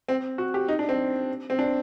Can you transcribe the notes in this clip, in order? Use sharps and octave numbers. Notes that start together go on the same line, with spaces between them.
C4
F#4
G4
D#4
D4
C4
C4
D4